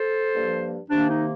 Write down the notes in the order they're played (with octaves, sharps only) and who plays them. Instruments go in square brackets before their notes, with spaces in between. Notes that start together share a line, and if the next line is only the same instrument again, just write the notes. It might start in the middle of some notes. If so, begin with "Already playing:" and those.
Already playing: [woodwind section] A4 C5
G2 F3 A#3
C3 D#3 A#3 D4
D#4